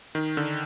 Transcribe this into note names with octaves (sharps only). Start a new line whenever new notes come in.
D#3
D3